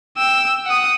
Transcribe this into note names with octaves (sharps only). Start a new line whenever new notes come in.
G5 E6
F#5 D#6